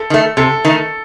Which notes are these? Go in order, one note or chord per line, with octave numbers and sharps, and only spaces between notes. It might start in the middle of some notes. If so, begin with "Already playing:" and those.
Already playing: A4
D#3 A3
C3 A4
D#3 A3